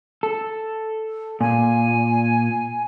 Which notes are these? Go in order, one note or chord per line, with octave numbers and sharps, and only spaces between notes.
A4
A#2 G#5